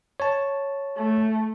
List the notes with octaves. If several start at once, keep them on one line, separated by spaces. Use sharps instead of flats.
C#5 A5
A3